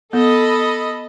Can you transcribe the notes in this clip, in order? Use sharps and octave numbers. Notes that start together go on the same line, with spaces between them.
B3 A4 D#5 B5